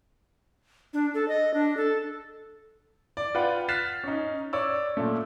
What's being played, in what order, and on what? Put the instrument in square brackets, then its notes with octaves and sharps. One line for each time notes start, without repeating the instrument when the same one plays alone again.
[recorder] D4
A4
D#5
D4
A4
[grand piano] D5
F4 B4 F#5 G5
F6 F#6 A6 B6 C7 E7
C#4 D#4
C#5 D5 E6
A#2 A3